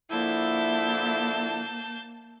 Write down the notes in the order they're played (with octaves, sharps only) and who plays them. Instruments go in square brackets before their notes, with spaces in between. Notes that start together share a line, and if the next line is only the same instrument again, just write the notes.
[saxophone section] D3 F3 E4 [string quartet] A#3 A5 G6